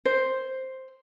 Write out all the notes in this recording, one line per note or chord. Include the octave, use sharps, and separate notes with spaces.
C5